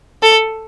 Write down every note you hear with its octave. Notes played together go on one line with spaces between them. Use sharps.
A4